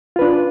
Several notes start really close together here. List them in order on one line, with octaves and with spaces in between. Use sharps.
F4 B4 D4